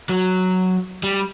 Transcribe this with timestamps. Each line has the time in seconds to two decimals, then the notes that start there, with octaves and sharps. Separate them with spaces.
0.09 F#3
1.03 G3